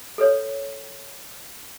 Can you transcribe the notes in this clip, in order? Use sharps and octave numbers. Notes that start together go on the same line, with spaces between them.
A4 B4 C#5